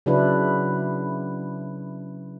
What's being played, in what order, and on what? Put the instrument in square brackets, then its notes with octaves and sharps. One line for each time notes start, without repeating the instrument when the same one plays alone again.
[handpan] C#3 F#3 D4 E4 B4